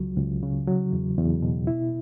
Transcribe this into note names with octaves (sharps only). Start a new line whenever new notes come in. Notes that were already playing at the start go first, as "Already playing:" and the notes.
Already playing: C#2 F#3
C#2
C#3
F#3
E2
E2
B2
E4